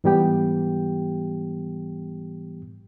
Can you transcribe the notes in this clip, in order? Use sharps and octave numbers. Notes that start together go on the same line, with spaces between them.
G#2 E3 G3 B3 G4 G5